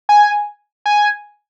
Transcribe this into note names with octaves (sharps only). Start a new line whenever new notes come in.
G#5
G#5